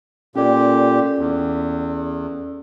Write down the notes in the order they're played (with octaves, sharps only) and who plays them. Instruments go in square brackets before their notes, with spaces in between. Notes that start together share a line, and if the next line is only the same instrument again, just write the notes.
[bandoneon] A#2 G4 [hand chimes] C#4 A4 D5
[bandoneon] E2